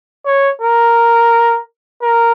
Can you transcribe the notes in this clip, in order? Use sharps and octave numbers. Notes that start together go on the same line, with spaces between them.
C#5
A#4
A#4